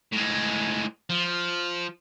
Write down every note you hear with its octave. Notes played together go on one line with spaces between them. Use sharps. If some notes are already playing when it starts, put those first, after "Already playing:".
A2 G#3
F3